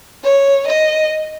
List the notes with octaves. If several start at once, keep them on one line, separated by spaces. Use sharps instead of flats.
C#5
D#5